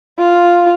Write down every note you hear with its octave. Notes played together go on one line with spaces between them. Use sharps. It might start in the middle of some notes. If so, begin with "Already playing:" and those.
F4